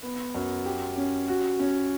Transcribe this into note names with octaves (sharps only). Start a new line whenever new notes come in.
B3
F#2
G4
C#4
F#4
C#4